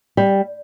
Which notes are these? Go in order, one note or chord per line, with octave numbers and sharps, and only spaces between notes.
G3